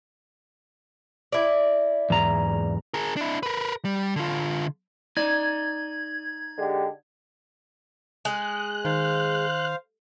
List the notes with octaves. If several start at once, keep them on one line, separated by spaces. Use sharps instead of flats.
E4 D5
E2 G#2 A#5
G#4 A#4
D4 E4
A#4 B4
G3
D3 F4
D#4 D5 G#6
D3 G#3 G4
G#3 F#6
D#3 C5 F5